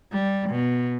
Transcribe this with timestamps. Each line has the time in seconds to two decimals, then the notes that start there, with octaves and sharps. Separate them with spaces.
0.12 G3
0.50 B2